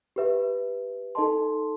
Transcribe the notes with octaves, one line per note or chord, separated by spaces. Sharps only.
G4 B4 E5
D#4 A4 D#5 A5 C6